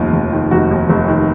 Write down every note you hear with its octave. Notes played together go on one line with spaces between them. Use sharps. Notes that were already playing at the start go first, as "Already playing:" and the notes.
Already playing: F1 D#2 F4
F1
D#3
F1 F#4
D#2
F1
D#3